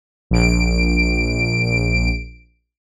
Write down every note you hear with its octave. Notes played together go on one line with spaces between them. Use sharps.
A#1 D7